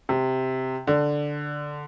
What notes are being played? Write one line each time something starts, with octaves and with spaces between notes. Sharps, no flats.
C3
D3